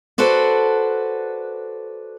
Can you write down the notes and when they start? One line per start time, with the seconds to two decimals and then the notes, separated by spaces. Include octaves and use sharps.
0.18 F#4 A4 B4 C5 D5